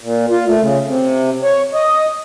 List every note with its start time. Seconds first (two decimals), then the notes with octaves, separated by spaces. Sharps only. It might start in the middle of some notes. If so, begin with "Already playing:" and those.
0.01 A#2
0.30 F4
0.46 A3
0.61 C#3
0.86 C3
1.43 C#5
1.74 D#5